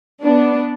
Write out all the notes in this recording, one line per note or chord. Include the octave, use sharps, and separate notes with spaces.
B3 D4